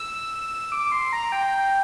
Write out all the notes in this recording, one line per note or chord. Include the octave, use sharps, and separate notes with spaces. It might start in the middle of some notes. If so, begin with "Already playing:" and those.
Already playing: E6
D6
C6
A#5
G5